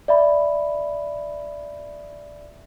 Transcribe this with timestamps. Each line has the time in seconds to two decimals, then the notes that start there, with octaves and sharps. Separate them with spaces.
0.08 D5 E5 B5